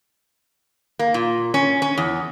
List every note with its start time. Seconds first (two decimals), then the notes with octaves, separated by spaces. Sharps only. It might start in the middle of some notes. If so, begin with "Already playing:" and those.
0.99 A#3
1.14 A#2
1.54 C#4
1.82 C#4
1.97 E2